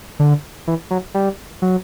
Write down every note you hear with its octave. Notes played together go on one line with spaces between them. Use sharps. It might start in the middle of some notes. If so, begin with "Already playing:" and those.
D3
E3
F#3
G3
F#3